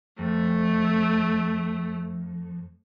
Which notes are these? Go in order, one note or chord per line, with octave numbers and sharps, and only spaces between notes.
F2 A3